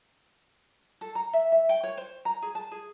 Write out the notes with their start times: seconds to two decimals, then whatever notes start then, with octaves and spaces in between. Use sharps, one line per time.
1.01 A4
1.15 A#5
1.33 E5
1.52 E5
1.69 G5
1.83 C#5
1.97 C5
2.25 A#5
2.42 G#4
2.55 A5
2.72 G#4